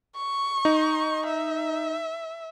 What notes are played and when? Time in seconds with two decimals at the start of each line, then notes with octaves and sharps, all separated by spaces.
0.17 C#6
0.65 D#4
1.27 E5